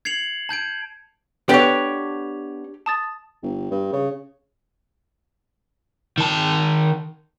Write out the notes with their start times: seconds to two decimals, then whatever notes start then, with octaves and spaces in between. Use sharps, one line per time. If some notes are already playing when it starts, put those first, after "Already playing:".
0.05 G#6 C7 C#7 F7 F#7
0.49 A5 G6 G#6 D7
1.49 B3 D4 G4 A4 C#5 G5 D7
2.86 A5 D#6 A6
3.43 G1
3.71 G2
3.93 C#3
6.18 D#3 A5